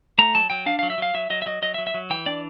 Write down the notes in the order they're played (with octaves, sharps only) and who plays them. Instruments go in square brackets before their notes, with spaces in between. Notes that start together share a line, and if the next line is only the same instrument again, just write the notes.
[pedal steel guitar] A3 A#5
F#3 A5
F#3 G5
D4 F5
F#3 F5
E5
F#3 F5
F#3 E5
F#3 D#5
E5
F#3 D#5
F#3 D#5
E5
F#3
E5
F#3
E3 G5
D4 D5